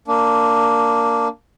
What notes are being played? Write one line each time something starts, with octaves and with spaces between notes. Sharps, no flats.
A#3 D4